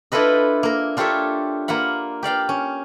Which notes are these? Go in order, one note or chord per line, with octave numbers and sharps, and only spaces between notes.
D4 E4 F4 A4 B4 D#5
A#3 A#4
D4 F4 G4 A4 C#5 E5
A#3 F4 F#5 B5
G4 D5 F5 G5
C#4